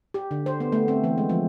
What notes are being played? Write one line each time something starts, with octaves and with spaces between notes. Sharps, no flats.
G4
D3
C5
B3
A3
C4
E3
G#3
F3